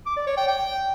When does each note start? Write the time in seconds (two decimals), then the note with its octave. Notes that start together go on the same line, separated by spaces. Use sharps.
0.06 D6
0.17 D5
0.27 C#5
0.37 G5
0.48 G5